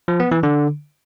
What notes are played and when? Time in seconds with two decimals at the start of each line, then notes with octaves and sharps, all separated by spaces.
0.08 F3
0.20 B3
0.31 E3
0.43 D3